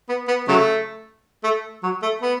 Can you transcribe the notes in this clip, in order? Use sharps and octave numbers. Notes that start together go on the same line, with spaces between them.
B3
B3
C#3 F#3 A3
A3
F#3
A3
B3